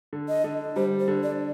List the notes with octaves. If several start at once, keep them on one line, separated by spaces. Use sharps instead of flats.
D3
D#5
D3
G3 C5
C5
D3
D5